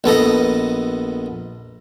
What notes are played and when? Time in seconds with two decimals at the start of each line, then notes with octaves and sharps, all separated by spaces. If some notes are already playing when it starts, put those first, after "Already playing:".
0.04 A#1 B3 A4 D#5